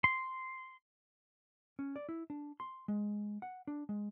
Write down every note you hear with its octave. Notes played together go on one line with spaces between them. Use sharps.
C6
C#4
D5
E4
D4
C6
G#3
F#5
D4
G#3